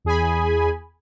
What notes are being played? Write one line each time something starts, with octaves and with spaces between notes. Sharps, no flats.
E2 G#4 G#5 B5